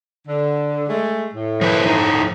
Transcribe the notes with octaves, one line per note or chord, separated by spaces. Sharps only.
D3
G#3 A3
A2
F3 B4 C5
F3 D#4